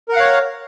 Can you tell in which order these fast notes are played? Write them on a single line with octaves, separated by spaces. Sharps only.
A#4 F#5 F5 C#5